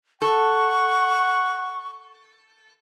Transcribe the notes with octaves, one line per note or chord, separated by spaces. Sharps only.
A4 F#5 C#6